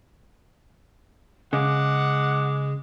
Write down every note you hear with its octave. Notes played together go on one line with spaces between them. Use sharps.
C#3 G#3 F#5 D6